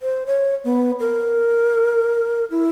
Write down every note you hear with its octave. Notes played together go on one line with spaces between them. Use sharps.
C5
C#5
B3
A#4
E4